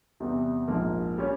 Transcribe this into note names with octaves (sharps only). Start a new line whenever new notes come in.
E2 C3 G3
A#1 G#2 F3 A#3
G3 C#4